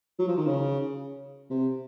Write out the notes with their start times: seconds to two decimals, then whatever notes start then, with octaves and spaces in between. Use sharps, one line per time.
0.19 F#3
0.28 F3
0.38 D#3
0.47 C#3
1.50 C3